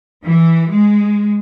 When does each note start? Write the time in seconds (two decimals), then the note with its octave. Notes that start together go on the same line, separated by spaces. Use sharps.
0.24 E3
0.70 G#3